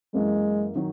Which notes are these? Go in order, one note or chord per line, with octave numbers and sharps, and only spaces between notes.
F#2 E3 G#3 A#3
D#3 F#3